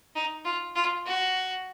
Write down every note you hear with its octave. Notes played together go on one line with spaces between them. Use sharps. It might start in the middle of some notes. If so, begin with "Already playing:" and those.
D#4
F4
F4
F#4